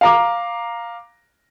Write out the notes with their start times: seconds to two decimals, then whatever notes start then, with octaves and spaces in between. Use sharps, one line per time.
0.01 F5 A#5 D6